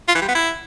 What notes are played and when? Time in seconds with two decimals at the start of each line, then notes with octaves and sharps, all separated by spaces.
0.08 F4
0.15 E3
0.22 G3
0.28 B3
0.35 E4